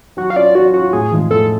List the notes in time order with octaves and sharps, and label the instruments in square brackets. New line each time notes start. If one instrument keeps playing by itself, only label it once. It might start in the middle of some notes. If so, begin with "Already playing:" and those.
[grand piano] F#3 [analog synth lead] F#4
[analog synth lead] F5
[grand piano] C#4 F4 [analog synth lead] D5
[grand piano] F#3 [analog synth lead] F#4
[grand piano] C#4 F4 [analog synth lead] F#4
[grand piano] A2 [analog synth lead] G#4
[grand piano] F3 G#3
[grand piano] A2 [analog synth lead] A4